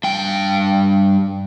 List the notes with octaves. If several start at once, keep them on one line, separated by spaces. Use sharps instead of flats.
G2 G5